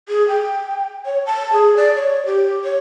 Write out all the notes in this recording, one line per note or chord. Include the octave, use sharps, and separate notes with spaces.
G#4
G5
C#5
A5
G#4
D5
C#5
G4
C#5